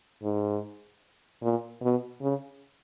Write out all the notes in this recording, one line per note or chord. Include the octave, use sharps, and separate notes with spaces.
G#2
A#2
B2
C#3